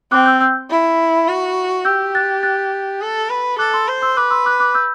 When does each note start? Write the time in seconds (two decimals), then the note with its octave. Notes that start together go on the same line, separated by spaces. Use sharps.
0.12 C4 D6 F#6
0.26 E6 G6
0.40 E6 G6
0.70 E4
1.28 F#4
1.85 G4 E6 G6
2.15 F#6 A6
2.43 F#6 A6
3.01 A4
3.30 B4
3.58 A4 D6 F#6
3.73 C6 E6
3.88 C5
4.02 C6 E6
4.17 B4 D6 F#6
4.31 C6 E6
4.45 D6 F#6
4.60 D6 F#6
4.74 E6 G6